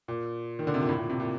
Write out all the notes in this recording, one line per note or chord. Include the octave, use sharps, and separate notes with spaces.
A#2
D#3
D3
C3
A#2
A2
A#2
C3
A#2